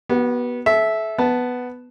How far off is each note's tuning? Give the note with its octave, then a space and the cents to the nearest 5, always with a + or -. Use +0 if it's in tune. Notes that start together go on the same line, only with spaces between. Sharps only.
B3 -20 F#4 +40
A4 -35 E5 -5
B3 +5 A5 +0